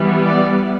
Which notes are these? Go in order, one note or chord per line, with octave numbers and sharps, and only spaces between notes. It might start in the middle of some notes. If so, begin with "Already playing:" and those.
Already playing: E3 G3 B3
D5